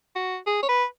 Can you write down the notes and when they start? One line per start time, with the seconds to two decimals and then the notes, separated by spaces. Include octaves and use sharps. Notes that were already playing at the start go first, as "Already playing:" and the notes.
0.16 F#4
0.47 G#4
0.63 C#5
0.69 B4